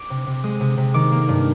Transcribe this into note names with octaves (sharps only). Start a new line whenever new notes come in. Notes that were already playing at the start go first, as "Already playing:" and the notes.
Already playing: D6
C3
C3
G#3 D#6
C3
C3
D#3 D6
A#3
G2